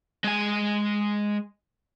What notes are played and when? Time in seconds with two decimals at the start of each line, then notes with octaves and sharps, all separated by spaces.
0.24 G#3 G#5